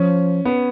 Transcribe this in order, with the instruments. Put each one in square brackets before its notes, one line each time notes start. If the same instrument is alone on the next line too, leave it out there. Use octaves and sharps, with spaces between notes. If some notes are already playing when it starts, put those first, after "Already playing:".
Already playing: [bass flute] F3 [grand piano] C#4
[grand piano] B3